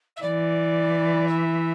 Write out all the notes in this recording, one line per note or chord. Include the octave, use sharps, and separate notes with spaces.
E5
E3 D5
E5